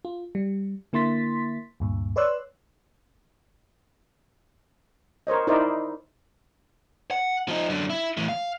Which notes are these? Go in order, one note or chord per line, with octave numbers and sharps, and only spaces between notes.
F4
G3
D3 A#3 E4 C6 A6 B6
D2 G2 A#2
B4 C#5 D5 C6 E6 F#6
A#4 C5 C#5 D#5
D#4 E4 A#4 C5 D5 D#5
F#5
F3 D#4
F#2 D3
E4
A2 E3
F5